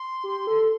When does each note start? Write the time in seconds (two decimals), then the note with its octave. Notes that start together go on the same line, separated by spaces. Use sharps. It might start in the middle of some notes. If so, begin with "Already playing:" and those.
Already playing: C6
0.24 G4
0.47 A4